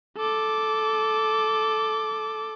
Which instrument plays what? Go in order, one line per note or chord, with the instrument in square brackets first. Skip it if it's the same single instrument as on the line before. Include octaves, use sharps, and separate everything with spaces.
[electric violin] A4 D6